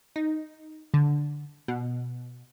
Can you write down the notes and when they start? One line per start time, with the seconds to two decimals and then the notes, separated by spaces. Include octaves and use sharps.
0.16 D#4
0.94 D3
1.68 B2